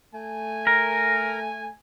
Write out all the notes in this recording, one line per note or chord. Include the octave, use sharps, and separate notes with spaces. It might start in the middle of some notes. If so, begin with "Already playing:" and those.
A3 G#5
A#4